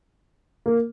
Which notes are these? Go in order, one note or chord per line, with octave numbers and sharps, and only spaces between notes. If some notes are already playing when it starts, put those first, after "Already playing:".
A#3